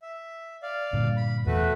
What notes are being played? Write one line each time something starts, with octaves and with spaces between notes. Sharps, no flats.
E5
D5 F5
G2 A#2 D3
B5
E2 B2 A3 F#4 B4